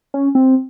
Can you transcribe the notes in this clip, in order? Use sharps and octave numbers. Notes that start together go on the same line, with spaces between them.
C#4
C4